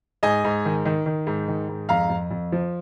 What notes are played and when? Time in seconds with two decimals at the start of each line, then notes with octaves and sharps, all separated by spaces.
0.23 G#2 D#5 G#5
0.44 G#2
0.65 D#3
0.85 D#3
1.06 D#3
1.27 G#2
1.48 D#3
1.68 G#2
1.89 F2 F5 A#5
2.10 F2
2.31 F2
2.52 F3